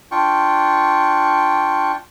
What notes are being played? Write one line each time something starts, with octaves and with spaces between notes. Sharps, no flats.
D4 F4 G5 C#6